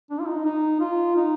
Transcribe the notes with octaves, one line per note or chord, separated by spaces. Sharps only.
D4
F4
D#4
D#4
F4
D#4